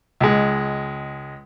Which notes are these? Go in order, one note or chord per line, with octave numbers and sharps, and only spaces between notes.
C#2 G#3